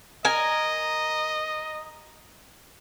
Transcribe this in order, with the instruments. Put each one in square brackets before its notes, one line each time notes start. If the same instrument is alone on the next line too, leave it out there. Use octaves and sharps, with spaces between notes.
[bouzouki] A#4 G#5 [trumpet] D#5